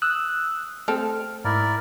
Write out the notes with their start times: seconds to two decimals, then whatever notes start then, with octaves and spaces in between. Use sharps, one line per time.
0.02 D#6 E6 F#6
0.88 A3 C4 A4 F6
1.45 G#2 E4 A#4 D5